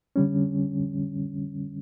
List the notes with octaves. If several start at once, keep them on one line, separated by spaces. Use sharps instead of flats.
D3 G3 C#4